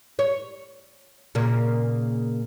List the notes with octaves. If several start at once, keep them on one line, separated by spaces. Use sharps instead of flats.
C#5
A#2 C#3 A#3